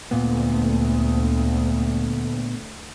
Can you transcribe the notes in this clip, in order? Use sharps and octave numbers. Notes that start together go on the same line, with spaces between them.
D2 A#2 B3